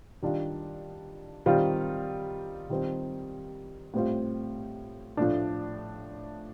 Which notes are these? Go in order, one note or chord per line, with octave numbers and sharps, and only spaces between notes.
D#3 G3 D4 F4
D#3 G3 C4 F4
D#3 G3 C4 F4
A2 G3 C4 F4
A2 F3 A3 D4